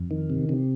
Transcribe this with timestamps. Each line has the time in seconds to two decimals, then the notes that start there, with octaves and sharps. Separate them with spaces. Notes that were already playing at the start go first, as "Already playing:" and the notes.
Already playing: F2
0.11 D#3
0.30 C3
0.49 C3